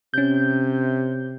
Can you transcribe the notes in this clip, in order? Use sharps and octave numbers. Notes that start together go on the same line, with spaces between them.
C3 C#4 G6